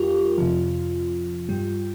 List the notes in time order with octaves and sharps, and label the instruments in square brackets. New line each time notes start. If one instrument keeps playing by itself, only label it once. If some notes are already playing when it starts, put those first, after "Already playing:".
Already playing: [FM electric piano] F2 G3 F4 G4 A#4
F2 C3 F3
G2 G3